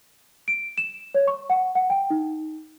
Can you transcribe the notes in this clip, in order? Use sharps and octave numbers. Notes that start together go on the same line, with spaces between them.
D7
E7
C#5
C#6
F#5
F#5
G5
D#4